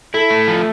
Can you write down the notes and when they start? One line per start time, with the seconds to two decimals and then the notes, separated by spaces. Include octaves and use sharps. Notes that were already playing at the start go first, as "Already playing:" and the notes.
0.14 E4 A4
0.30 A3
0.48 F3